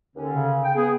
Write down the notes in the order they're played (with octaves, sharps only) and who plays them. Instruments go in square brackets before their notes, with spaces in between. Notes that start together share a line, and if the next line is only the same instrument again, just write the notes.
[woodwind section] D#2 D3 C#4
[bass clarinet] C#3
[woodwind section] G5
[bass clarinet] B3 [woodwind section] G#4